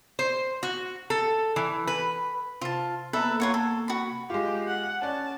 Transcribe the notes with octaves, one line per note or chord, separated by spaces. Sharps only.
C5
F#4
A4
E3
B4
C3 F4 A5
A#3 B3 A4 B4 E5
A#3 F4 C#5 F#5
A4
F#4 B5
G#3 F4 G4
F#5
C#4 D5 A5